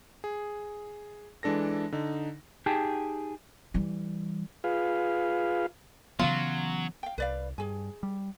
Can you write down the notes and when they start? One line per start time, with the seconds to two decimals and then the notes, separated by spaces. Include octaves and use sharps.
0.24 G#4
1.43 E3 G#3 D4 A4 A#6
1.92 D3 D#4
2.66 D#4 G4 G#4 G5 A5
3.74 E3 G3
4.64 F4 G#4 B4 F5
6.19 C#3 E3 F#3 B3 F4
7.03 F5 G5
7.18 C2 B4 D5 F5
7.58 G2 G#4 G#5
8.03 G3